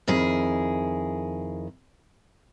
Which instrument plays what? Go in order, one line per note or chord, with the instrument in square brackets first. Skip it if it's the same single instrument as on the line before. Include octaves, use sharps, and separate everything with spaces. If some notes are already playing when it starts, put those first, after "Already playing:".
[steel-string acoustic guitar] F2 D#3 E4 G#4